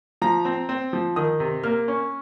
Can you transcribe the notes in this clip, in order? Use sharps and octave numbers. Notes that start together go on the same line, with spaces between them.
F3 A#5
C4
C4
F3
D#3 D#6
C3
A#3 F6
C#4